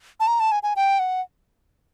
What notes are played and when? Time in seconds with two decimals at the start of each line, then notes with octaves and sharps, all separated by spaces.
0.20 A5
0.27 A#5
0.40 A5
0.52 G#5
0.63 G#5
0.76 G5
0.99 F#5